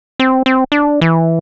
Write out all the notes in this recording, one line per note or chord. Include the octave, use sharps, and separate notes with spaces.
C4
C4
D4
E3